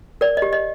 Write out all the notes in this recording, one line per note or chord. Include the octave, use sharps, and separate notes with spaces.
A#4 D5
G4 D#5
D#5